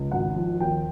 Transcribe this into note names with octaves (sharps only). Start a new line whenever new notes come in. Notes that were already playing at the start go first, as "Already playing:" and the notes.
Already playing: C#2
G#1 F#5
F3
D#2 G5